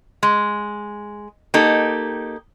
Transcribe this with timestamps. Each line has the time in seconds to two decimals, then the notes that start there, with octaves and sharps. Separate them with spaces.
0.23 G#3
1.54 A#3 D#4 G4 A4